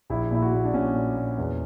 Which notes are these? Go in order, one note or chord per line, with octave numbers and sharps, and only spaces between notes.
A#1 E4
A#2 E4
F#4
A#2
D4
A#2 C#4
A#2
A#2
E2